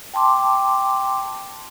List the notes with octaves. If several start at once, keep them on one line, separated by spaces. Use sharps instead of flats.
G5 A5 C6 D6